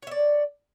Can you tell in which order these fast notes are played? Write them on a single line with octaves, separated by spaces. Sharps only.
C#5 E5 D5